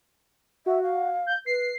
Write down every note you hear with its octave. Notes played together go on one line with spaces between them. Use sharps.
F#4 E5
F5
G6
B4 C7